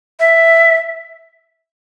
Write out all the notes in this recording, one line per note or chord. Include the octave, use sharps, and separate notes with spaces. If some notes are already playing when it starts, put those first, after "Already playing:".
E5